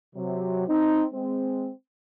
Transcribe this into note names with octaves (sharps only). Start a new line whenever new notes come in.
C3 F#3
C4 D#4
G#3 C4